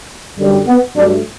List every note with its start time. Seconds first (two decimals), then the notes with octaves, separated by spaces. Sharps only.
0.38 F#2 D3 G3
0.67 B3
0.95 G2 F#3 A3 D4